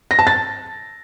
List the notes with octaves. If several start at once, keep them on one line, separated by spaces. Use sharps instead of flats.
A#6
A5
A6